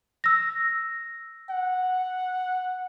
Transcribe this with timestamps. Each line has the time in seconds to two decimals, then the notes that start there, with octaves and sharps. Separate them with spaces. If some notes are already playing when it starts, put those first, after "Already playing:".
0.24 E6 A#6
1.50 F#5